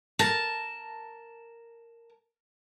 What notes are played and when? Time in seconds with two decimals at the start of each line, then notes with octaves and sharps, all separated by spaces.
0.19 A#4 A5